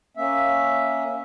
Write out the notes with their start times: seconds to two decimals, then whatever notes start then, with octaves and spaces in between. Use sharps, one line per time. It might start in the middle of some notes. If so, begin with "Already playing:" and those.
0.17 A#3 C#4 E5